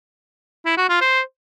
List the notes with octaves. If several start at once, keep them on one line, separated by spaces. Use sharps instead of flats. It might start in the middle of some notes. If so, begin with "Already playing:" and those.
E4
F#4
F4
C5